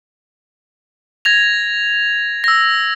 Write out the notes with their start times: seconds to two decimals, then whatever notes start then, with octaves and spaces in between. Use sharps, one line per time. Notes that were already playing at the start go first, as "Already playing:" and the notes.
1.25 G#6 A#6 F7
2.44 E6 A#6